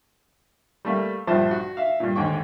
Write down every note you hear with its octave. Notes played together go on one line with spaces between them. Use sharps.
G3 A3 A#3
A#1 G2 F3 C5 E5 A5
F#4
E5 F5
G2 A#2
D#2 G#2 D3 G5 C#6